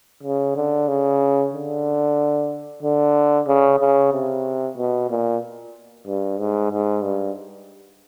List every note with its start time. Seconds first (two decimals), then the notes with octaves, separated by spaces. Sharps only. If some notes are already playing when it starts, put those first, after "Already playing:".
0.23 C#3
0.56 D3
0.88 C#3
1.53 D3
2.83 D3
3.48 C#3
3.79 C#3
4.12 C3
4.77 B2
5.10 A#2
6.07 G2
6.39 G#2
6.71 G#2
7.03 G2